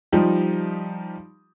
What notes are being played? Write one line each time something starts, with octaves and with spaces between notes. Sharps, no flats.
F3 G3 D#4 F4 G4